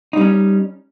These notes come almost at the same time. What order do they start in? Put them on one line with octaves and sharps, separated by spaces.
D#4 G3 C#4